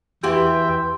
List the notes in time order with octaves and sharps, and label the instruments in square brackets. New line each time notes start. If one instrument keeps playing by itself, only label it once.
[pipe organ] E2 E5 G5 [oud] E3 F#4 G4 [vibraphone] B4 C6